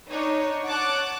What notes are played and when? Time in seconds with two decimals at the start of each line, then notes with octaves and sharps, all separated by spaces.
0.10 D4 D#4 C#5
0.65 C#5 F#5 A5 D6 F#6 A6